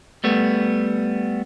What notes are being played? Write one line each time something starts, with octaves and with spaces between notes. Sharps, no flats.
G3 A3 B3